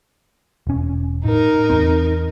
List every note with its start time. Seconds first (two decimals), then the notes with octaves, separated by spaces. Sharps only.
0.67 E1 C#4
1.25 A2 D#4 A#4
1.70 E2 C4